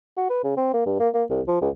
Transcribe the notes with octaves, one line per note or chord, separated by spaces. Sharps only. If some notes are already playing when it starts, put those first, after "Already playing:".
F#4
B4
C#3
C4
A#3
G2
A#3
A#3
C2
F3
C#2